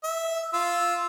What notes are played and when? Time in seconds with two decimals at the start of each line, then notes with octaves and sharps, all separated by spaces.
0.04 E5
0.53 F4 E6